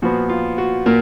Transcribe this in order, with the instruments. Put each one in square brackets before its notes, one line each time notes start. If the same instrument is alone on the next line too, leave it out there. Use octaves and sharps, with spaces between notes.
[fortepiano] A#2 F3 B3 F#4
F4
F#4
A#2 A#4